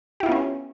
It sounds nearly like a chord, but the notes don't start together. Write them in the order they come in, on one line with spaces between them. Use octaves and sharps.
G4 E4 F4 B3 C#4